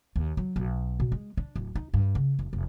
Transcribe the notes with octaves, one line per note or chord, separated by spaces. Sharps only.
D#2
F#3
B1
B2
G#3
D4
D1
D#4
G2
C#3
F1
F1